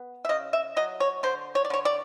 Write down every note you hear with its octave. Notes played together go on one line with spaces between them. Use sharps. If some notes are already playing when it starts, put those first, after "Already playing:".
Already playing: B3
E5
C#3 D#5
E5
F#3 D#5
C#5
D3 C5
C#5
D5
D3 C#5
D5